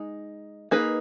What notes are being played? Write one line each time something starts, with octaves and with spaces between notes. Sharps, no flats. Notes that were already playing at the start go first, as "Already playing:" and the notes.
Already playing: G#3 D#4
A#3 D#4 G#4 B4